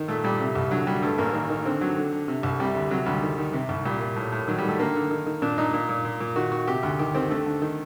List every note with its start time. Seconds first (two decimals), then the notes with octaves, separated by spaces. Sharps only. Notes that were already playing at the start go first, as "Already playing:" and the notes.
Already playing: D#3
0.08 A#2 A3
0.24 A#2 G3
0.40 C3
0.55 C2
0.71 D3 F#3
0.87 D3 G3
1.02 G2 A3
1.18 A1 A#3
1.34 D#3 A#3
1.50 D#3
1.65 D3 C4
1.81 D3 F#3
1.97 D3
2.12 D3
2.28 C3
2.43 C2
2.60 C3 G3
2.75 D2
2.91 C3 F#3
3.06 D2 G3
3.22 D#3
3.38 D#3
3.53 C3
3.69 C2
3.85 A#2 G3
4.01 A#2
4.16 A2
4.32 A2
4.47 D#3 F#3
4.58 G3
4.63 D#3
4.69 A3
4.79 D3 A#3
4.95 D3
5.11 D#3
5.26 D#3
5.42 A#2 D4
5.58 A#2 D#4
5.74 A#2
5.89 A#2
6.05 A#2
6.20 A#2
6.36 D#3 F#4
6.52 D#3 F#4
6.67 C3 G4
6.83 D2
6.99 D#3 G4
7.14 D#3 C4
7.30 D3 A3
7.46 D3
7.62 D#3